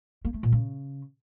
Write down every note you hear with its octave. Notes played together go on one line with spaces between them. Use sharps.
A#3
A3
A#2
C#3